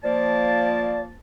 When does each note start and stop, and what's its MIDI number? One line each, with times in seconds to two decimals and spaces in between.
0.03 1.13 53
0.03 1.13 58
0.03 1.01 74
0.03 1.13 81